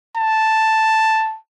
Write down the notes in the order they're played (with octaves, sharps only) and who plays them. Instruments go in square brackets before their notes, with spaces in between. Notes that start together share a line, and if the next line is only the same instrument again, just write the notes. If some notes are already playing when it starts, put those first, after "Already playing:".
[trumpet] A5